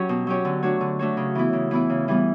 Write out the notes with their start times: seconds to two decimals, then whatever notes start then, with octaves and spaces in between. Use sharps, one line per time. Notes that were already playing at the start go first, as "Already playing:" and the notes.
Already playing: F#3 C#4 G4 C#5
0.09 B2
0.27 F#3 C#4 G4 C#5
0.45 D3
0.63 A3 D4 F#4 C#5
0.81 D3
0.99 A3 D4 F#4 C#5
1.17 C#3
1.35 E3 B3 E4
1.53 C#3
1.71 E3 B3 E4
1.90 C#3
2.08 E3 G3 B3